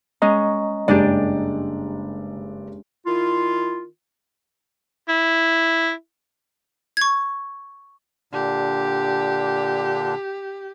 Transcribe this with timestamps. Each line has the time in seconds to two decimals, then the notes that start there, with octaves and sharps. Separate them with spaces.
0.22 G#3 C#4 D#5 A#5
0.88 F#1 G2 G#3 D4 G4 D5
3.06 D#3 E4 F4
5.09 E4
6.97 C#6 G#6
8.33 A#2 D3 D4 G4